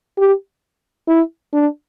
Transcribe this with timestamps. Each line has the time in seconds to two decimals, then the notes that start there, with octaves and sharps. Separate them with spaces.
0.18 G4
1.07 E4
1.53 D4